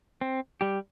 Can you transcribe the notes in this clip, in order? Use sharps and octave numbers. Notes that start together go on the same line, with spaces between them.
C4
G3 G4